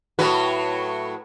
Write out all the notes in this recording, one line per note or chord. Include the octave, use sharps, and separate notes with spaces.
A2 F#3 B4